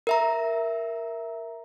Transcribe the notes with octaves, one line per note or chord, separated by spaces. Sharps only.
A#4 E5 A#5